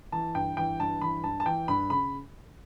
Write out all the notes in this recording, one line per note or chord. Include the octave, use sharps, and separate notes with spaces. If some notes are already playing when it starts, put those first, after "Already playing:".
E3 A5
G2 G5
E3 G5
G2 A5
E3 B5
G2 A5
A5
E3 G5
G2 B5
C#3 B5